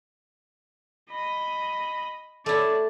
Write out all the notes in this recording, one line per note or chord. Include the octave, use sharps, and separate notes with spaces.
D#5 B5
A3 E4 D5 A5